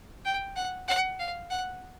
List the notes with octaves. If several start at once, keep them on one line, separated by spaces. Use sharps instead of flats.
G5
F#5
F#5
F5
F#5